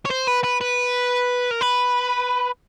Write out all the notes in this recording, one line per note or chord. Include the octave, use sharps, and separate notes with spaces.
C#5
C5
B4
B4
B4
A#4
B4